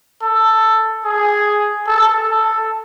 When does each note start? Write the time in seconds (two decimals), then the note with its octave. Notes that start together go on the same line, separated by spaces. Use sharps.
0.22 A4
1.05 G#4
1.87 A4
2.29 A4